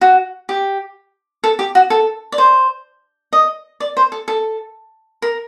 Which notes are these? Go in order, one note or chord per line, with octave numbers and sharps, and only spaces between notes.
F#4
G4
A4
G4
F#4
A4
D5
C5
D#5
D5
C5
A4
A4
A#4